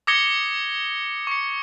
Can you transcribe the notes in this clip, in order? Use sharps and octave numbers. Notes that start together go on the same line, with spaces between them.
D6 D#6 G#6 A#6 C#7 G7
C#6 C#7